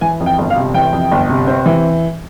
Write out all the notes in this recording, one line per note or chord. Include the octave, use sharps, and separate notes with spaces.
E3 G#5
F2
G5
G1
F5
C3
E3 G5
F2
G1
C3
C4
E3